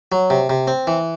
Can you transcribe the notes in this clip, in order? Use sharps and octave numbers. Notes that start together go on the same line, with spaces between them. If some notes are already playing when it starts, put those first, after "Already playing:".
F#3
C3
C3
C4
E3